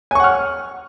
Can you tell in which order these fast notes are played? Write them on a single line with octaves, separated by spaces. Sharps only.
G#5 C#6 F#5 F6